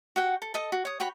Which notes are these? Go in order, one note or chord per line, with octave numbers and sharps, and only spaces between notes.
F#4 F#5 G5
A4
A4 D#5 A5
F#4
C#5 D#6
F#4 C#5 G5 B5